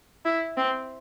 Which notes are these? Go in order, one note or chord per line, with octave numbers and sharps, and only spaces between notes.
E4
C4